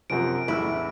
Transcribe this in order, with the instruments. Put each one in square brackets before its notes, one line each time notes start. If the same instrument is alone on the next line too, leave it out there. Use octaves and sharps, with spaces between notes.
[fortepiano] F#2 C3 F3 [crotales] D7
[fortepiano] A1 E2 E6 [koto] E4